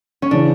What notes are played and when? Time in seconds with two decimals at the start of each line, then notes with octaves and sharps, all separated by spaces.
0.22 C#4
0.31 C#3 E3 D4